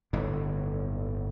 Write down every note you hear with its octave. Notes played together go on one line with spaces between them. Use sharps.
G1 A2 D3